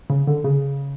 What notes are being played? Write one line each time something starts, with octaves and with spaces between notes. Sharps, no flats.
C#3
D3
C#3